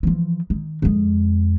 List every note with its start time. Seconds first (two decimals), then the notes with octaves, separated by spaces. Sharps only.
0.03 E3 F3
0.50 D#3
0.82 F2 G#3